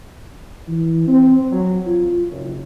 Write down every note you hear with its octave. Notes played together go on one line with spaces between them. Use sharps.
E3
C4
F#3
F4
F#1